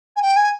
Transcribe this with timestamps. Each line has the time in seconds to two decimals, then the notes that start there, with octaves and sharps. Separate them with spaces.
0.16 G#5
0.22 G5
0.36 G#5